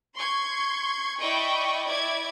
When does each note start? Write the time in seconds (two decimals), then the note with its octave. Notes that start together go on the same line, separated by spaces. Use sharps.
0.15 C6 C#6 G#6
1.20 E4 D5 D#5 G5 B5 C#6
1.87 E4 D5 G#6